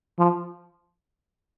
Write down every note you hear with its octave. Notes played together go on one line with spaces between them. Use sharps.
F3